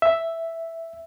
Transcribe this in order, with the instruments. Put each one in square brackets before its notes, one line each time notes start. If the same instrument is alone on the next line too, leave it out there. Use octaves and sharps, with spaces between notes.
[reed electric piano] E5